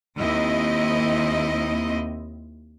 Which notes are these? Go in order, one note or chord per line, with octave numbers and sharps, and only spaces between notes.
D#2 C4 E4 D#5